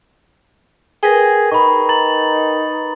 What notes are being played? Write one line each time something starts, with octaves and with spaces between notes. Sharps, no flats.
G#4 A#4 B4 G5
D#4 B5 C#6
A#5 A6 F#7